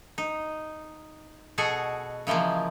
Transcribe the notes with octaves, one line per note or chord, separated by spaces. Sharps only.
D#4
B2 F#4 G#4 A4 D#5
C#3 E3 F3 G#3 A#3